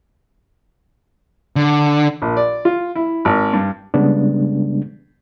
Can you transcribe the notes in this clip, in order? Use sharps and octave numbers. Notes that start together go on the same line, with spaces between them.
D3
A#1
D5
F4
E4
G#1
G2
C#3 G3 G#3 B3 D4